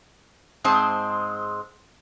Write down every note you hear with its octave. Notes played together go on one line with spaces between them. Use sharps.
G#2 G#3 C4 C5 A5